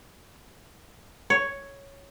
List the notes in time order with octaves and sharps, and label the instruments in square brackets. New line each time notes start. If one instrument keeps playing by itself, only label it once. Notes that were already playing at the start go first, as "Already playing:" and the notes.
[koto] C#5